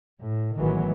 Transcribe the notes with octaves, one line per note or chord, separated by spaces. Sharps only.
A2
A1 D#3 E3 F#3 G#3 B3